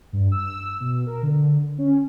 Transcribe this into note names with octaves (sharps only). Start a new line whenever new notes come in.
G2
E6
B2
A#4
D3
C#4